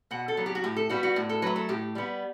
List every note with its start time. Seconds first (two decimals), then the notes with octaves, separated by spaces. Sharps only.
0.11 B2 F#5
0.28 A4
0.37 F#3 B3
0.46 G4
0.55 F#4
0.64 A2 G4
0.76 A4
0.89 G3 B3 F#4
1.03 F#4
1.16 A2
1.29 A4
1.42 F#3 A3 B4
1.56 A4
1.69 A2 G4
1.95 G3 B3